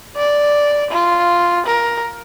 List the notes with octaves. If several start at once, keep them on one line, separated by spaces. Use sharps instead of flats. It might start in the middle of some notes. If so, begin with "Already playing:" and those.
D5
F4
A#4